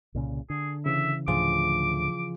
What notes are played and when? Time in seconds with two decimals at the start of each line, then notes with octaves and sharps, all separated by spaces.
0.15 C2 A#2 C#3
0.50 D3 G#4
0.86 C#3 E3 E5
1.28 D2 A2 D3 F3 F4 G#4 D6